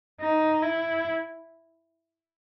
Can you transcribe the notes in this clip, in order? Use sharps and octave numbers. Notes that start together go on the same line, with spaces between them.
D#4
E4